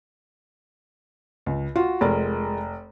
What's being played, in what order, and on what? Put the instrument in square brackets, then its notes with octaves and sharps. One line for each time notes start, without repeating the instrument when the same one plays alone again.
[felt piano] C#2
[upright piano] F4 [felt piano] F#4
[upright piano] F1 [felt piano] G#3 F4 A#4